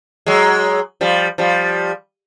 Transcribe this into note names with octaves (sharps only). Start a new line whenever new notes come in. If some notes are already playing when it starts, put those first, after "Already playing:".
F#3 G#3
F3 G3
F3 G3